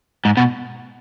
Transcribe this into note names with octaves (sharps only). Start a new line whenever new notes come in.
G#2
B2